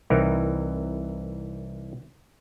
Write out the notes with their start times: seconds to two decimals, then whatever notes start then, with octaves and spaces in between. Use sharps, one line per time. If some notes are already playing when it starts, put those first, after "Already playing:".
0.10 C2 E3 C4 D#4 A#4